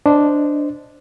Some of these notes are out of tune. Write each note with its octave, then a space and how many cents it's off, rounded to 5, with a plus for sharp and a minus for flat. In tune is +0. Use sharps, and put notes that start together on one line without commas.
D4 +0 C5 -15 D#5 +0